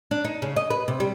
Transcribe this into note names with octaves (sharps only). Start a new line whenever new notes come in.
D4
D#4
C#3
D#5
B4
C3
G3